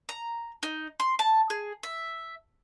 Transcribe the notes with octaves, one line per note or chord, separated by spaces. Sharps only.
A#5
D#4
C6
A5
G#4
E5